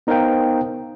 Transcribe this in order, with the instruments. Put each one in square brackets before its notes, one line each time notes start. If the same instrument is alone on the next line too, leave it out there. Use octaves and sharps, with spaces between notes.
[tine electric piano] B3 D#4 A#4 C5 F5 G5